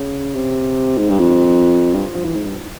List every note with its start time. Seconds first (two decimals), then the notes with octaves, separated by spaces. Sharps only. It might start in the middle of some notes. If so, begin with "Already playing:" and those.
Already playing: C#3
0.34 C3
0.98 G#2
1.09 G2
1.19 F2
1.94 G2
2.15 F3
2.24 E3
2.36 G#2
2.46 G2